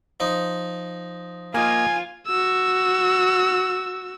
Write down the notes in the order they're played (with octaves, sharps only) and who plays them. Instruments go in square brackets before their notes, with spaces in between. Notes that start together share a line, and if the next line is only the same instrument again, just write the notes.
[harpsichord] F3 D#4
[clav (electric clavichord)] A#3 D#5 [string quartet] F4 [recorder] G#5
[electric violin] F#4 E6